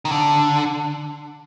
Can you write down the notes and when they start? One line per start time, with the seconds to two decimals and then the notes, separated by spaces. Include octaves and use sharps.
0.05 D#3
0.11 D3